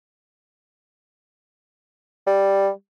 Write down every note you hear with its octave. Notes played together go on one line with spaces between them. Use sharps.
G3